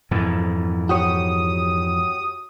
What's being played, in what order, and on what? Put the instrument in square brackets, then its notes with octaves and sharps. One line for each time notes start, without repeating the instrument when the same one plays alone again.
[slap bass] F2 G#2 E3
[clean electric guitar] F#4 G4 C#5 [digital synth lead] D#6